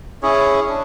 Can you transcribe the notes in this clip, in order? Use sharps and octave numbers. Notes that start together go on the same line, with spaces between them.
C#4 E4 G#4 C#5
D4